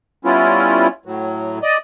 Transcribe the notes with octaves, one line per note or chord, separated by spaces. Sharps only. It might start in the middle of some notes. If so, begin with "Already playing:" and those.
G3 B3 C#4 E4 F4
A2 F#3
D5 D#5